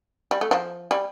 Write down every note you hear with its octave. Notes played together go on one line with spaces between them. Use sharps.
G3
A3
F3
G3